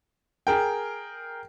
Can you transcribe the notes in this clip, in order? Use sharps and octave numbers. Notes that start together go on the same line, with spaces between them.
G#4 A#4 G5